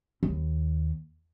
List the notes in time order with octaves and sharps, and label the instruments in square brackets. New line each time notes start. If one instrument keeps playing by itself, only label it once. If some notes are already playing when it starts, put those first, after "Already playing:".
[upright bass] D#2